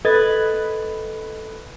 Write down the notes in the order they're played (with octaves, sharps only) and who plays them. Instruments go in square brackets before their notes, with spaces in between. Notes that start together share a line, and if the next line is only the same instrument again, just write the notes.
[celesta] A4 [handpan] B4 [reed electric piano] D#5 G#6 A6